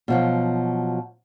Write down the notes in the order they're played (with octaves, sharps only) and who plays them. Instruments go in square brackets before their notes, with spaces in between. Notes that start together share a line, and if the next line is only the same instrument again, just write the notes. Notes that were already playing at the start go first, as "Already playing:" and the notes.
[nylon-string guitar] B2 F3 F#3